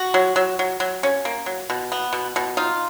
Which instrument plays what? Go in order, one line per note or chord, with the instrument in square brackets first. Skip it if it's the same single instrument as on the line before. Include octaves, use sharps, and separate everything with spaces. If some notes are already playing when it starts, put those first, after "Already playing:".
Already playing: [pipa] F#4
F#3
F#3
F#3
F#3
C#4
A#3
F#3
B2
B3
B2
B2
D#4 F4